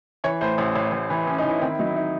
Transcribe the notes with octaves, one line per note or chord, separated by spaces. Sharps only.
E3 C#5
A2 C5
A1
A1
A1
E3
A1 C#4
D#4
E3
E4
D#3 C4
E4
F#3 D#4
E4
D#4